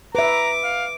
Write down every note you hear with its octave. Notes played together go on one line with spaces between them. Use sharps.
B4 E5 A#5 D6
F5